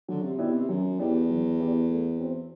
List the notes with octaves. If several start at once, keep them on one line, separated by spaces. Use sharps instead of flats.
D3 F#3
C3
B2 B3 E4 G4 D5
C3
F#2 F#3
E2 B3 E4 G4 D5
F#3
B3 E4 G4 D5
A3
C4 F#4 C5